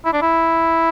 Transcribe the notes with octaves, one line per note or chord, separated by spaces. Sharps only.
E4
D4
E4